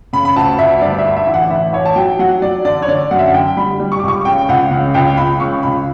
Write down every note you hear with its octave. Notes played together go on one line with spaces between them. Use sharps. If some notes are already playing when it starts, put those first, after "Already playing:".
C#3 B5
B5
D2 A5
D2 E5
G2 D5
E5
D3
E5
A1
F#5
A1 E5
A1 C#5
A5
F#3 G5
F#3 F#5
F#3 D5
D3 D5
C#5
D3 D5
F#2 F#5
E5
F#5
D3 G5
G3 B5
G3
C#6
D6
C#2 C#6
C#3 G5
C#2 F#5
C#3
C#2 G5
C#2 B5
C#3 C#6
C#2 B5